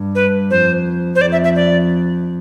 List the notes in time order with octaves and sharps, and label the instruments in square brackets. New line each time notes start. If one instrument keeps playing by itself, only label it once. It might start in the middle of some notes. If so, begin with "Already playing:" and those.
Already playing: [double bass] G2
[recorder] B4
[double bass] F2 [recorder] C5
[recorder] C5
[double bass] F2 [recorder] D5
[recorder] E5
E5
D5